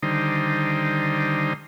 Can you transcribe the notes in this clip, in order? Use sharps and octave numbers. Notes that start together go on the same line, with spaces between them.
D3 D#3 G3 D#4 C5